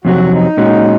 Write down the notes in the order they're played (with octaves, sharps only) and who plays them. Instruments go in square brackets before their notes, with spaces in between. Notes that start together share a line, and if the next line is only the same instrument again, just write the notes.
[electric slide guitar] F2 C3 F#3 [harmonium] F#4
[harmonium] D#4
[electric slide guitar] A#2 G#3 C#4 F#4